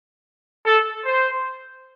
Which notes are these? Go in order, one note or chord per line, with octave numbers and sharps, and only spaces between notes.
A4
C5